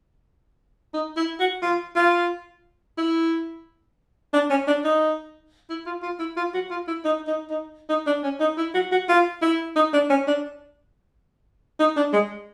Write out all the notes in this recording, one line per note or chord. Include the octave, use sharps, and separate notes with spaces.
D#4
E4
F#4
F4
F4
E4
D4
C#4
D4
D#4
E4
F4
F4
E4
F4
F#4
F4
E4
D#4
D#4
D#4
D#4
D4
C#4
D#4
E4
F#4
F#4
F4
E4
D#4
D4
C#4
D4
D#4
D4
G#3